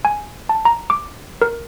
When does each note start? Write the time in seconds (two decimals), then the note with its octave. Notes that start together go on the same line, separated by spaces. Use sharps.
0.05 G#5
0.49 A5
0.65 A#5
0.90 D6
1.42 A#4